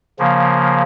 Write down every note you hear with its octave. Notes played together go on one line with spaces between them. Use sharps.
C#3 F3 A#3